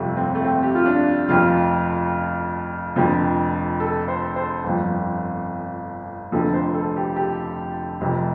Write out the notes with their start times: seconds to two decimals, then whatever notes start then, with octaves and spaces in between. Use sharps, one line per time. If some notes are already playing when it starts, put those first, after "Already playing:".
Already playing: G1 F2 C3 F3 A3
0.17 C4
0.35 A3
0.44 C4
0.63 G4
0.75 F4
0.86 D4
1.28 F1 F2 F3 F4
2.96 F1 F2 D3 F3
3.80 A4
4.08 C5
4.36 C5
4.64 G1 F2 F3
6.32 F1 F2 D3 F3 A4
6.54 C5
6.74 A4
6.96 G4
7.16 G4
8.01 F1 F2 C3 F3